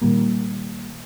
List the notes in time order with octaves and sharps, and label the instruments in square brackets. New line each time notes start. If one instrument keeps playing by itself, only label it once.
[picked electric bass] A#2 D#3 G3 A#3